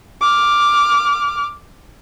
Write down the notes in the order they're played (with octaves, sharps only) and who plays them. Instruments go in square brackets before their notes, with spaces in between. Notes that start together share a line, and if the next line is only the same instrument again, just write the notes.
[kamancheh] D6 F6